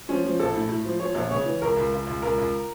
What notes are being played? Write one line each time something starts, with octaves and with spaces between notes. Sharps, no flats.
F3 C#4
F3
A#1 A4
A2
A2
F3
F3 C#5
A#1
C#3 C#5
E3
C#2 A#4
C#2
C#2
C#2
C#2 A#4
C#2